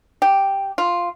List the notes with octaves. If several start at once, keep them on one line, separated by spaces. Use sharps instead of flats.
G4
F4